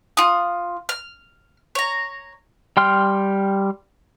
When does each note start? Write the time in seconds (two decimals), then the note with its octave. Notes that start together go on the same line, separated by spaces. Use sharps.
0.17 F4 D#6
0.89 F6
1.75 C#5 A#5
2.77 G3 G5 C6 F6